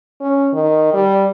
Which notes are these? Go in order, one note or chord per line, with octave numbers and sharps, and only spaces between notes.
C#4
D#3
G3